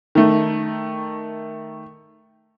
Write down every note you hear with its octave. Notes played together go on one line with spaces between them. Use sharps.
D#3 A3